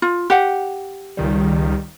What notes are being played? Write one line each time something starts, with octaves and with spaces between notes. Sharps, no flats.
F4
G4 F#5
C#2 D#3 G3